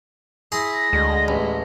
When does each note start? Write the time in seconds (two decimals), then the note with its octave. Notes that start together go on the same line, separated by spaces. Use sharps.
0.52 E4 G#4 C6 A#6
0.93 D2 G#3
1.28 A1 B5